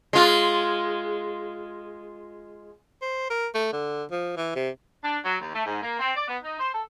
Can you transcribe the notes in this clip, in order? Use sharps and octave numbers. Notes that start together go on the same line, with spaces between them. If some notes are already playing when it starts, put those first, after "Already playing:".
G#3 F4
C5
A#4
A3
D3
F3
E3
C3
D4
F#3
D#2
A3
G#2
A#3
C4
D5
B3
D#4
C5
A4